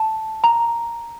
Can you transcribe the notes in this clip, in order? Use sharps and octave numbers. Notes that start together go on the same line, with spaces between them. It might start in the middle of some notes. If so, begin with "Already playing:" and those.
Already playing: A5
A#5